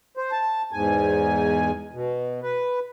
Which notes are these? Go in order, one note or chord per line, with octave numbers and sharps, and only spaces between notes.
C5
A5
E2 G#2 G#5
B2
B4